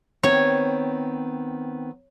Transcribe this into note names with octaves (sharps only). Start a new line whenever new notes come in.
D#3 B3 C4 C#5